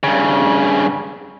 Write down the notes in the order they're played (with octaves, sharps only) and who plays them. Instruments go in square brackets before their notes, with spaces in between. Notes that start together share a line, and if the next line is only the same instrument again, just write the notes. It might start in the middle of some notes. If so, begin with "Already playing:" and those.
[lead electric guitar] G2 C#3